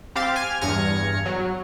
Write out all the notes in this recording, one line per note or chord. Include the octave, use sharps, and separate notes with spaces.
C4 G4 F5 D6 A6
G#5 F6
E2 G2 F6 G#6 A#6 C#7
F#3